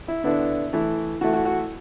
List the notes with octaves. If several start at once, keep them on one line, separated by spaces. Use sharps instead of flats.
E4
D3 B3 D4 E4
E3 A3 E4
E3 A3 E4 F#4
F#4
F#4